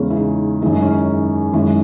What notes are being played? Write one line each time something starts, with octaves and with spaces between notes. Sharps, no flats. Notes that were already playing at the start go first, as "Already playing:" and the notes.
Already playing: E2 C#3 G#3 C#4
E4
D#4
F#2 D#3 G#3 E4
D#4
C#4
D#4
F#2 D#3 G#3 E4